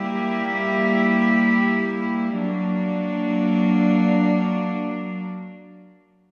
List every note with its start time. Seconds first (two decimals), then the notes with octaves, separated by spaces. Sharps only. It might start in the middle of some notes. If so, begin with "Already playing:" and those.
Already playing: G3 A#3 E4 G4
2.35 F#3 A#3 D4